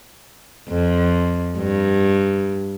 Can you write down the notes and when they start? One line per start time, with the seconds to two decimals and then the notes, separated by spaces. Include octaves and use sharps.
0.69 F2
1.58 G2